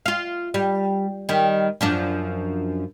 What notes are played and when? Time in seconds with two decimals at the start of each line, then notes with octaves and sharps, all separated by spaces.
0.06 F4 F5
0.54 G3
1.29 D#3 G3
1.81 F#2 F3 D4